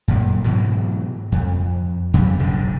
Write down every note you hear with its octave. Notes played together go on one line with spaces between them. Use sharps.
F#2 A#2
G#2 B2 E3 F#3
F2
F2 C#3 F#3 G3
F#1 B1 G#2 D3